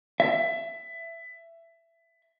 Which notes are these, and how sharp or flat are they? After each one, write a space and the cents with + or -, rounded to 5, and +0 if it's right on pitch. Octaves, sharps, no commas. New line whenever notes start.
E5 +20